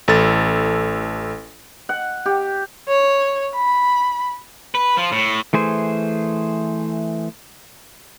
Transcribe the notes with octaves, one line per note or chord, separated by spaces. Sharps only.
A1 A4 A6
F#5
G4
C#5
B5
B4
F3
A2
E3 A3 G#4 C5